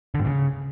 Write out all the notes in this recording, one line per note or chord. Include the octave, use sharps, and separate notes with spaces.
D3
G#2
C#3